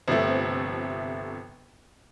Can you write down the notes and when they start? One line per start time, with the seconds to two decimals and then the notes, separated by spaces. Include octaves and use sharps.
0.08 G1 C3 F3 A3